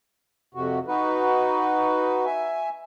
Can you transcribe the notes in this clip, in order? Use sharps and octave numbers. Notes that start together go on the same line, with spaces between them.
F2 C3 F#4
D#4 F#4 B4
E5 G#5